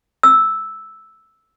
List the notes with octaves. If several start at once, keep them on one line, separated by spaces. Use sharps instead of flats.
E6